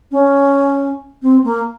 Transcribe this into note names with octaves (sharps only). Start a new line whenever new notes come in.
C#4
C4
A#3